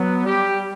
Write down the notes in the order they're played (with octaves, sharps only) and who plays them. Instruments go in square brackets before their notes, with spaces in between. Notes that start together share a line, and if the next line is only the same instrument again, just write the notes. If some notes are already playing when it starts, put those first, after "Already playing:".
Already playing: [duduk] F#3 [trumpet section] B3
[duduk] G3 [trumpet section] G4